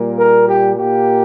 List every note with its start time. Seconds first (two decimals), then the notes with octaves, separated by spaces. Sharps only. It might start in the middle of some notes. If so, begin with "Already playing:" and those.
Already playing: A#2 G3 A#3
0.19 A#4
0.48 G4
0.76 A#2 A#3 G4